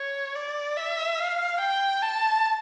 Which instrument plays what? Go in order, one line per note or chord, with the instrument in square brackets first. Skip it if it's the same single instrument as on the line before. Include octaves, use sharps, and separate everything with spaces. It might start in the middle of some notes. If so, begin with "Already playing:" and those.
Already playing: [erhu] C#5
D5
E5
F5
G5
A5